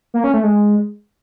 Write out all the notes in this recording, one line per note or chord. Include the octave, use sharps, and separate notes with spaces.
A#3
C#4
A3
G#3